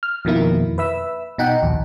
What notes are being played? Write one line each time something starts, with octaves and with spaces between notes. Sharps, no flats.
F6
F2 B2 D#3 A#3 E4
B4 E5 E6
B2 D#4 F#5 G5
A#1 D#2